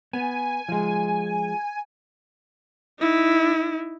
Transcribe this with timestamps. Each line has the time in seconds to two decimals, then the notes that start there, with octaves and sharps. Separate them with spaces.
0.13 B3 G#5
0.69 F3 G#3
3.00 D#4 E4